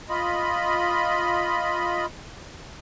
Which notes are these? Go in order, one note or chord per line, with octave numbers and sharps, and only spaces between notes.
F4 D#5 B5